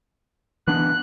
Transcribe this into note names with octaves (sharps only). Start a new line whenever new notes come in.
E3 B3 D4 F#6